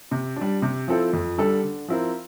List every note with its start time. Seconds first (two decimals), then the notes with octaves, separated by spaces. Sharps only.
0.11 C3
0.36 G3 D4
0.62 C3
0.88 F3 C4 E4 A4
1.13 F2
1.38 D3 G3 D4 A4
1.63 D3
1.88 F3 C4 E4 A#4